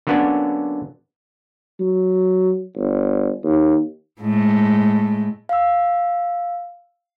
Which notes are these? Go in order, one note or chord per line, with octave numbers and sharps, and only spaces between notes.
D3 F#3 A#3 B3 C#4 D4
F#3
G1
D#2
A2 G#3
F5 E6